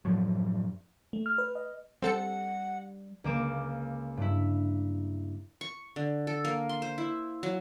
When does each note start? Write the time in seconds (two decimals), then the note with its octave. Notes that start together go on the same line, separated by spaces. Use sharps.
0.05 F#2 A2 F3 F#3
1.13 A3
1.26 F6
1.38 B4
1.55 D#5
2.02 G3 C4 A4 F#5 C#7
3.24 C#2 A#3 D6 E7
4.17 G2 E4
5.61 C#6
5.96 D3
6.27 A4
6.45 A#3
6.69 C6
6.82 C5
6.98 E4
7.43 F#3